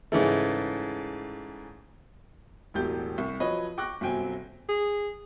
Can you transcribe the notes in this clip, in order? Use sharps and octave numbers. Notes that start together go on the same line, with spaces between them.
G#2 C#3 E3 A3
E1 A1 F#3 G4 G6
C2 C#6
F3 F#3 B4 C#5 D#5
G5 C#6 D6 F#6 A#6
G1 C3 F#3 C4 G5 G#5
G#4